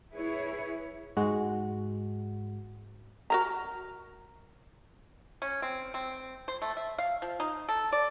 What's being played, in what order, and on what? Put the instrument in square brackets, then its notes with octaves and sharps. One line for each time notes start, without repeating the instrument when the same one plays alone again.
[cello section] E4 G#4 B4 C#5
[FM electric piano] G#2 G#3 F#4
[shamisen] F#4 A#4 A#5
[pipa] C#4
C4
C4
C5
A3
E5
F5
F3
D#4
A4
D5